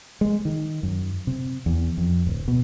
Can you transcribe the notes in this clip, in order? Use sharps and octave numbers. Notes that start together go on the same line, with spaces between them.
G#3
D#3
F#2
C3
E2
F2
D1
B2